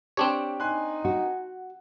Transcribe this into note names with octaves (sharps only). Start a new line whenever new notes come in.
C4 D4 G4 C#5
D#4 G#5 C6 F#6
F#4